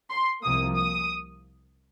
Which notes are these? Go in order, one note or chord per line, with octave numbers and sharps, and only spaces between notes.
C6
C2 C3 F3 A#3 D#6
D#6